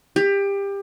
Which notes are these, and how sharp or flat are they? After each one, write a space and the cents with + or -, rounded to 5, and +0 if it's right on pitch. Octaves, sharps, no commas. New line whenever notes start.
G4 +25